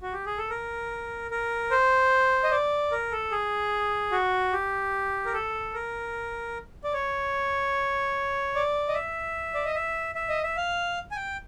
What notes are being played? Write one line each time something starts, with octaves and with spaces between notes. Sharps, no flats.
F#4
G4
G#4
A4
A#4
A#4
C5
D#5
D5
A#4
A4
G#4
F#4
G4
A#4
A4
A#4
D5
C#5
D5
D#5
E5
D5
D#5
E5
E5
D#5
E5
F5
G#5
G5